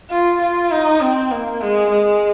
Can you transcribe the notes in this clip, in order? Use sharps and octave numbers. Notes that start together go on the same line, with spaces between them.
F4
F4
D#4
C4
A#3
G#3
G#3